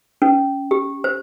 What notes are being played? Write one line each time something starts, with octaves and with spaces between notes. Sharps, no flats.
C#4
G4
C5